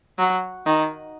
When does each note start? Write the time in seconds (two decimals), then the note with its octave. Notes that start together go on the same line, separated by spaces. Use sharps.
0.18 F#3
0.66 D#3